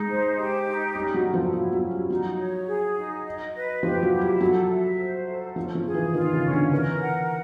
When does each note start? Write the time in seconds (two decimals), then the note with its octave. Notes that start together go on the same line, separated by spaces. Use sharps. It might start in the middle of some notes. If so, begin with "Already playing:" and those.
Already playing: G#3 D#4
0.09 C5
0.38 G4
0.66 D#4
0.95 G3 C#4
1.14 F#3
1.24 A4
1.34 F3
1.53 F#3 E4
1.73 F#3
1.82 C#4
1.91 G3
2.10 F#3 D#4
2.39 C#5
2.68 G#4
2.97 D#4
3.26 D#5
3.55 B4
3.83 F3 G4
4.03 F#3
4.12 E4
4.21 G3
4.41 F#3 A4
4.69 E5
4.99 C5
5.28 A4
5.56 F3 C#4
5.75 F3
5.85 G#4
5.94 E3
6.14 D#3 F4
6.33 C#3
6.43 C#4
6.53 D3
6.72 E3 A#4
7.01 F#5